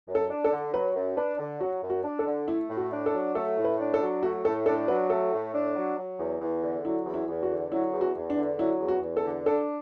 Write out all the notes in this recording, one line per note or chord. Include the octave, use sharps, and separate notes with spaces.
F#2
A4
D4
A4
D3
F#3 B4
F#2
D4 B4
D3
F#3 F#4
F#2
F#4
D4
A4
D3
A3 E4
A2
F#4
D4
A4
F#3
A3 A4
A2
B4
D4
A4
F#3
A3 F#4
A2 A4
D4 A4
F#3 B4
A3 A4
A2
D4
F#3
F#3
E2
E2
D3
F#3 E4
E2
E4
E2
F#4
D3
F#3 E4
E2
F#4
E2
D4
D3
F#3 E4
E2
F#4
E2
A4
D3
D4 A4